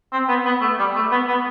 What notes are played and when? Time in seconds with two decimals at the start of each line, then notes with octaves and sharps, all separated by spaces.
0.12 C4
0.28 B3
0.45 B3
0.61 A3
0.78 G3
0.95 A3
1.12 B3
1.28 B3